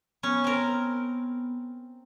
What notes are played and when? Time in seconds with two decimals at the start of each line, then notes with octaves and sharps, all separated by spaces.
0.23 B3 C#4
0.44 C4 A#4